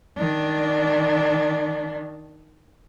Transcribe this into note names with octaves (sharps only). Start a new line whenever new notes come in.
D#3 D4